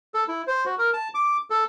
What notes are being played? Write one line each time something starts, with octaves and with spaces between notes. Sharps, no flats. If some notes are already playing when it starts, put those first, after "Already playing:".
A4
E4
C5
F#4
A#4
A5
D6
A4